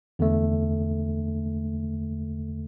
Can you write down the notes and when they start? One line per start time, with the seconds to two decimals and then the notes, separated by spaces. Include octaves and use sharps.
0.19 E2 D3 A3